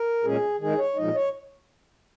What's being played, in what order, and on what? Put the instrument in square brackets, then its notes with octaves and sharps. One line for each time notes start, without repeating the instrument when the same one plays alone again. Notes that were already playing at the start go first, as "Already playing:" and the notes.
Already playing: [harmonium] A#4
A#2 G#3 C#4 G#4
D#3 G#3 D#4 G#4
C#5
A#2 F3 G#3 D#4 D#5
C#5